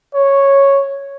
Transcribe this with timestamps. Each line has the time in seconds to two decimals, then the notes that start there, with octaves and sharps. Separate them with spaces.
0.14 C#5